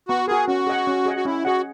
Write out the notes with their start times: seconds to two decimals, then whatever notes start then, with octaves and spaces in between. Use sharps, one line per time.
0.08 B3 F#4
0.28 F#4 G#4 A#4
0.47 C#4 F#4
0.67 G#4 D#5 F#5
0.87 C#4
1.06 G#4 D#5 F#5
1.16 F#4
1.25 C#4 E4
1.45 F#4 G#4 D#5 F#5